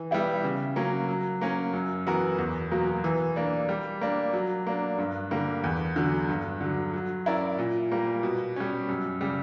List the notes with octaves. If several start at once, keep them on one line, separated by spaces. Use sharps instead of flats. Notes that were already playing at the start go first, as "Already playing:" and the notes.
Already playing: E3
G3 B3 E4 G4
C#3
F#3 A#3 C#4
F#3
A#3 C#4
F#2
E3 B3 F#4 A#4
E2
B2 F#3 A#3
E3
A#3 D4
G3
A#3 D4
F#3
A#3 D4
G2
D3 G3 A#3
E2
D3 F#3
G2
D3 F#3
F#3
C#4 E4 A#4 D5
A#2
G3 A#3
B2
G3 C#4
F#2
C#3 G3